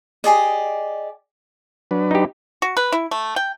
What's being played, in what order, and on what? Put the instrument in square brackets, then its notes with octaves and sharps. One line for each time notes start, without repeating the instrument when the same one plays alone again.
[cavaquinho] G4 G#4 D5 D#5
[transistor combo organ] F#3 D4 B4
[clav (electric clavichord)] D#4 G4
[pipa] F#4
B4
E4
A3
G5